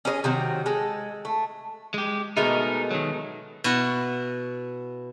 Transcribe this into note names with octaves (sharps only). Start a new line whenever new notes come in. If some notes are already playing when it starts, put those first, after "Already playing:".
C#4 G#4 A#4 D#5
C3 D#3 F#3
G#3 A4
A3
G#3 G4
B2 G#3 A3 D#4 A#4
D#3 F#3
B2 E4 F#5